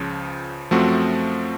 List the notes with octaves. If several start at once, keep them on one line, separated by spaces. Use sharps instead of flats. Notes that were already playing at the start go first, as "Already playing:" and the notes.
Already playing: C#2 C#3 F3
F#2 F3 A3 C4 F#4